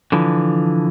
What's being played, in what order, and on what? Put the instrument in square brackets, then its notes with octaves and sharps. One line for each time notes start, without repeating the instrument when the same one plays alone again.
[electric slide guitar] D3 E3 F3